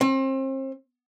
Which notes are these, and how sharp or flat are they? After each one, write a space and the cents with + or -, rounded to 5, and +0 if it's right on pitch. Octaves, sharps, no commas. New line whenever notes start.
C4 +35